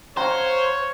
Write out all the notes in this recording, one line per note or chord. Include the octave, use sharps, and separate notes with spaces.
C5 C#5 F5 F#5 A#5